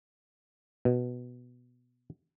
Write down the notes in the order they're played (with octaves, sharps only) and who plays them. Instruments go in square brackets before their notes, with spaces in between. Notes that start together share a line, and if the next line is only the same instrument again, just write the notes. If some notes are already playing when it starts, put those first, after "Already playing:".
[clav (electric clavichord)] B2